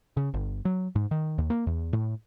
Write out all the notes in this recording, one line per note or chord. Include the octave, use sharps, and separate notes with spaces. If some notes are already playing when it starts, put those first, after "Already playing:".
C#3
G1
F#3
G#2
D#3
D#2
A#3
E2
A2